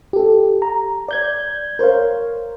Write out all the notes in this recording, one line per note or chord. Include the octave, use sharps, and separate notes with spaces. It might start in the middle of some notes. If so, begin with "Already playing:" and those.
G4 A4
A#5
D5 G6 G#6
A#4 C5 C#5 F5